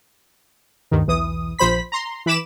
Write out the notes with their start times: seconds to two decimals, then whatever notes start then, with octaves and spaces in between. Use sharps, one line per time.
0.91 D2 G2 D#3
1.07 B1 E2 E3 D#6
1.59 A#1 F3 C5 B5 B6
1.92 A#5 C6
2.26 E3 B5 D6 E7